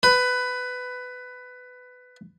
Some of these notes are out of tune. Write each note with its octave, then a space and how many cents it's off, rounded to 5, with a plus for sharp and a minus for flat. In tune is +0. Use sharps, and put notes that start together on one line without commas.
B4 +15